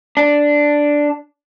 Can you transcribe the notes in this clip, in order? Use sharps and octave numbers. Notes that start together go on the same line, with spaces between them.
D4